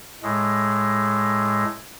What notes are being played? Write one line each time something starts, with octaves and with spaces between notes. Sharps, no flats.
A2 G#3